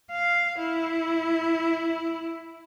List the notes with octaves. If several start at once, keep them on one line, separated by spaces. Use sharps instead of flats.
F5
E4